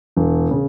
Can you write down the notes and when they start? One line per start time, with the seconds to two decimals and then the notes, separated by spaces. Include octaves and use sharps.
0.16 E1
0.51 C#3